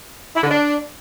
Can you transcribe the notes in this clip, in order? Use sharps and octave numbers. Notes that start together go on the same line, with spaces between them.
E4
D3
D4